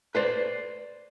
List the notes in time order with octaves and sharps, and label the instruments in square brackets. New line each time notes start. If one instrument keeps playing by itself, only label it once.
[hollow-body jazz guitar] B4 C5 D5